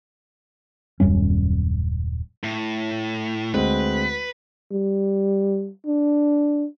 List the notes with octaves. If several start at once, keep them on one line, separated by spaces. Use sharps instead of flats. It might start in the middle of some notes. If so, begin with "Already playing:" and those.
D#1 F#2 G3 C#4
A2
D2 G#3 C4 B4
G3
D4